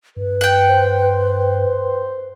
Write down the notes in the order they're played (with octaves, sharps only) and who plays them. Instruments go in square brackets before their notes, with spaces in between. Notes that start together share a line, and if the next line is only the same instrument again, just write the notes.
[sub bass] G2 [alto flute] B4
[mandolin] F#5 G5
[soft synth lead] C5